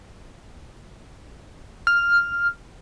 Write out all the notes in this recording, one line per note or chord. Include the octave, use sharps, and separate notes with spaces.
F6